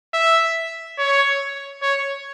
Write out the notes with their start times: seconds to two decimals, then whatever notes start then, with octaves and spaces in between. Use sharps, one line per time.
0.14 E5
0.98 C#5
1.82 C#5